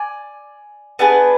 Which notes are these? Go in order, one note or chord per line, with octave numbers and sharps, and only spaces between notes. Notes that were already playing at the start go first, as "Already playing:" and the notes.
Already playing: D5 G#5
B3 D4 G#4 B4